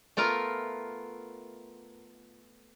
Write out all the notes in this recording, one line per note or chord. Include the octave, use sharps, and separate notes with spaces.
A3 B3 F4 A#4